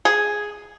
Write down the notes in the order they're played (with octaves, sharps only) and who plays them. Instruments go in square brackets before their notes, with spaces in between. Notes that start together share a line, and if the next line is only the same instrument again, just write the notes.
[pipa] G#4